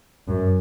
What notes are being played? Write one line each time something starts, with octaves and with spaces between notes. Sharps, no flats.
F#2